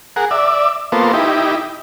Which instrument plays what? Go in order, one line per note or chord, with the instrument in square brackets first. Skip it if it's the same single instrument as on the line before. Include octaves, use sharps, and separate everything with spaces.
[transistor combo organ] G#4 A#4 F#5
D5 E5
A#3 B3 F4 A4 C5
D#4 E4 G4